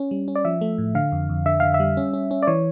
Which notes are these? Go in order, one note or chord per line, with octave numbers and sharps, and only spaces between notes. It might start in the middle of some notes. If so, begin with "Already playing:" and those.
Already playing: C#4
G3
C#4
D5
F3 E5
A3
A2
D3 F5
F2
F2
D3 E5
D3 F5
E5
G3
C#4
C#4
C#4
D5
E3 C#5